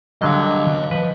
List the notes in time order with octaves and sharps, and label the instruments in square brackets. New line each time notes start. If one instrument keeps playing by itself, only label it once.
[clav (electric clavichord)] D3 F#3 G3 [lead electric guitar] D#5 F5
[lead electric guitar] E3 F3 [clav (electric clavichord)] B4